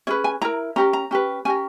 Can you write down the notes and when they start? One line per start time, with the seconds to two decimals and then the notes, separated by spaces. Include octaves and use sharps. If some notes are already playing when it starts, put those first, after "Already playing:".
0.07 C#4 G#4 B4 C#5
0.24 G#5
0.42 E4 A#4 A#5
0.76 C#4 G4 A#4 A#5
0.93 A#5
1.11 C#4 G4 B4
1.45 C#4 G4 A#4 G#5